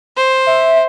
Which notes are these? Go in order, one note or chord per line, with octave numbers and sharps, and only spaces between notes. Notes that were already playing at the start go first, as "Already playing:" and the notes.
C5
E5